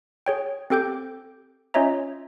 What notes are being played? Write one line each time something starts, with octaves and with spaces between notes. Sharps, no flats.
G#4 C#5 G5
C4 G4 A4 G5 D6 G6
C#4 F4 C#5 D#5 E5 A#5